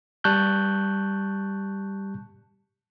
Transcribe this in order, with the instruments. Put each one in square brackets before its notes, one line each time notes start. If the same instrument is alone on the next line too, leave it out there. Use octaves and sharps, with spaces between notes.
[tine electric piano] G3 A5 C#6 F#6 G6